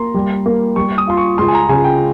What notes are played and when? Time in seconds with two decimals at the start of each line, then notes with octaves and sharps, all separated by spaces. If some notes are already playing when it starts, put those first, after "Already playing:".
Already playing: A#3 A#5 C6
0.14 G3
0.46 A#3
0.76 G3 C#6
0.98 D#6
1.07 F4 C6
1.17 C#6
1.38 C#2 C6
1.48 G#5
1.54 A#5
1.69 C#3 G#5
1.84 G5